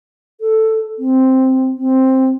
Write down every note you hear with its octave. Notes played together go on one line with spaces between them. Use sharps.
A4
C4
C4